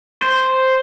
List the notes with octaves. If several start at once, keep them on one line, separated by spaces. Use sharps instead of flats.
C5